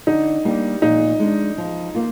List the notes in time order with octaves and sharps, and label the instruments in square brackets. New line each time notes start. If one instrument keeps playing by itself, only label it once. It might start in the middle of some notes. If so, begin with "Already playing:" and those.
[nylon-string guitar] D3 [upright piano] D#4
[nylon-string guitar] G3 A#3 D4 G4
[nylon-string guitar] A#2 [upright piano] D#4
[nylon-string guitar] G#3 D4
F3
A#3 F4